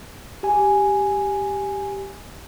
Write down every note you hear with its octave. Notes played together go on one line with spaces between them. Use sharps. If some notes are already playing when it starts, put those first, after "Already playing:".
G4 G#5